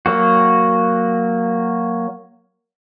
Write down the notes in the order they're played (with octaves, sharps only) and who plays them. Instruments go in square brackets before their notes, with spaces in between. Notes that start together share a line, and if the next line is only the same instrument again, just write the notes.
[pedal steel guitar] F#3 A#3 F#4